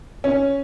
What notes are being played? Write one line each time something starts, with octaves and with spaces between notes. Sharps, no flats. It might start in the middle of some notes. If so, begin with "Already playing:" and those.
C#4